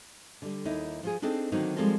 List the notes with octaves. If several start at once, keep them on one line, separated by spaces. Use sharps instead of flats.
D3 G3
D#2 D#4 E4
F3 F4 G#4
C4 D4 D#4 G#4 A4
D3 D#3 F#3 A#3 C4 D#4
F3 G3 G#3 C4 A4 A#4